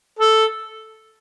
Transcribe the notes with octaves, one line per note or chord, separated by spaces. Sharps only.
A4